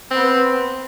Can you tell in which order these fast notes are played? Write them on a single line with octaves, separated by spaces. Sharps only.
C4 B3 B4 C5